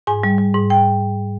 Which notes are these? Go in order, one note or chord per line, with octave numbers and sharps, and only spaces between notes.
G#2 G#5
G3
G3
G#2
G5